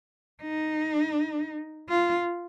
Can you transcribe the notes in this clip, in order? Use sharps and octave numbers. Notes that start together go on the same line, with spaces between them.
D#4
F4